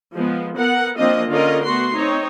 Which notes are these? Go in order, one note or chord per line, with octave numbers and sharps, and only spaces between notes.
F3 G#3 B3
B3 A#4 F#5
F3 A#3 C4 D4 F4 D#5
D3 C#4 F4 A#4 D#5
A3 B3 F#4 C6
C4 D#4 C#5